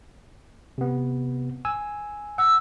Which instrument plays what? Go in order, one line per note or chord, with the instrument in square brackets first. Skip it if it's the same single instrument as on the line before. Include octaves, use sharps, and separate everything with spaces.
[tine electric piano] C3 B3
G#5 E6
[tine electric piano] F#5 [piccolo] E6